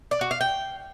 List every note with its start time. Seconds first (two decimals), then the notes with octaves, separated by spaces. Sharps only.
0.11 D5
0.21 F#4
0.31 F5
0.41 G5